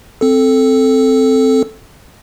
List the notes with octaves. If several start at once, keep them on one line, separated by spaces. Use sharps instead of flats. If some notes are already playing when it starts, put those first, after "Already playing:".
C4 A4